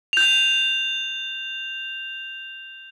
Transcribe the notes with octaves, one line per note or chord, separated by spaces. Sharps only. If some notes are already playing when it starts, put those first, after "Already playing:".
G6 F7